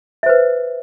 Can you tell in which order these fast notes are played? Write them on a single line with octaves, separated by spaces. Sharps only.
E5 C5 B4